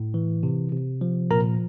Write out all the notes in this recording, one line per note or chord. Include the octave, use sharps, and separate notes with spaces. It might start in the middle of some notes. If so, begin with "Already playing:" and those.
Already playing: A2
E3
C3
C3
F3
A#2 A#4 A#5